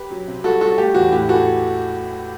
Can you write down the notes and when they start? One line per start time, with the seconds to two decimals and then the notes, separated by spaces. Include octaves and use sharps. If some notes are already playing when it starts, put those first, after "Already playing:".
Already playing: G4 B4
0.10 F#3
0.28 C3
0.44 G3 F#4 A4
0.61 G3 F#4 A4
0.78 A3 G4
0.94 E2 F#4
1.12 A2 G4
1.28 E3 F#4 A4